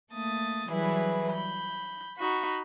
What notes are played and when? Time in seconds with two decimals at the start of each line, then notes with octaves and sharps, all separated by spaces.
0.11 A3 A#3 D#6 A6
0.69 E3 F#3 G3 E4 G#4 B4
1.31 B5 G6
2.16 D#4 F#4 B5